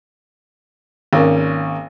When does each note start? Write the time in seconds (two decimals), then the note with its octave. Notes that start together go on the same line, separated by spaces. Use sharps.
1.13 G#1 A#3 C#4